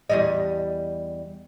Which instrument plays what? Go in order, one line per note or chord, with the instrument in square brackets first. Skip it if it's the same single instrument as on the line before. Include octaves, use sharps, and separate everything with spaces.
[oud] E2 G3 D#5